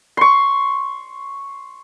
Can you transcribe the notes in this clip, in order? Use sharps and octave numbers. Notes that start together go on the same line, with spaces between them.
C6 C#6